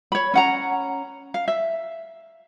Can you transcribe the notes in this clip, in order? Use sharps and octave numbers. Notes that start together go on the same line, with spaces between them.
C#5 B5
C#4 F#5 A#5
F5
E5